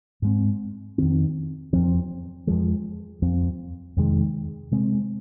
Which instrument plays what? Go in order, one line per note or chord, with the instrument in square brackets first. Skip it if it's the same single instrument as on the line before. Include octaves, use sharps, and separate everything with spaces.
[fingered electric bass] G#2 G#3 C4
F2 D#3 C4
F2 F3 C4
F2 F3 G#3
F2 F3 C4
F2 C3 D#3 G#3
C3 G#3 C4